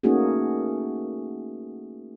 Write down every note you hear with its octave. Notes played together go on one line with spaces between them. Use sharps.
A3 A#3 C#4 D#4 F#4 G#4